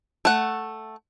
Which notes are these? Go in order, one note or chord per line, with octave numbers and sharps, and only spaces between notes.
A3 F#5